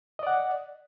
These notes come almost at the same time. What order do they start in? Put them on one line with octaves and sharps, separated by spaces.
D#5 D5 F#5